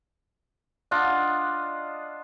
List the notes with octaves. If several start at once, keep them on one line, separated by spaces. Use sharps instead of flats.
D4 F4 D#5 F#5